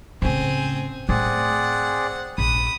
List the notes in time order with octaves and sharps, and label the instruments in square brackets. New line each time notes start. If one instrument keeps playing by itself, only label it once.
[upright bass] A2 C#3 [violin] C4 G#4
[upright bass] A2 A3 [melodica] C4 G#4 D5 [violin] F#5
[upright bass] A#1 [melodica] B5 [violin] D#6